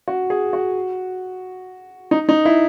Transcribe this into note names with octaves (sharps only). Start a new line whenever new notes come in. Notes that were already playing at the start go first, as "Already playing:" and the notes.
F#4
G#4
F#4
D#4
D#4
E4